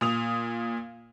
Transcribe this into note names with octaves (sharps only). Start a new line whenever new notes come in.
A#2 D#6 F7